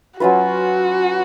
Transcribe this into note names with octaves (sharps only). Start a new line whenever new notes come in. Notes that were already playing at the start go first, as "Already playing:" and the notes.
F#3 C#4 F4 F#4 B4